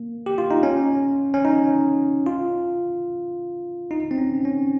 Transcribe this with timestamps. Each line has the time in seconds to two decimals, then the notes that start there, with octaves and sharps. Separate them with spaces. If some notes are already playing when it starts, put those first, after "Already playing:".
Already playing: A#3
0.26 G4
0.38 F4
0.51 D#4
0.63 C#4
1.34 C#4
1.45 D#4
2.27 F4
3.91 D#4
4.11 C4
4.18 C#4
4.45 C#4